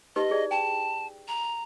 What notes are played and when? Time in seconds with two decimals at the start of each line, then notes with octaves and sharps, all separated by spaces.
0.16 D#4 G4 B4 D#5
0.30 E4 G#4 D5
0.51 G5 A5
1.28 A#5